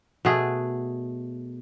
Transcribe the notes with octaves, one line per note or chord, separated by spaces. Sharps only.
B2 A3 G#4 F#5